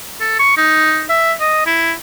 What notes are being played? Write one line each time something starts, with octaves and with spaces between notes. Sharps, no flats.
A4
C#6
D#4
E5
D#5
E4